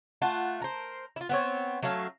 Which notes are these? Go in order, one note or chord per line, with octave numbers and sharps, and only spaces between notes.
A3 F4 F#5
A#4 C5
E4 F4
B3 C4 C#5
F#3 A3 C#4 F5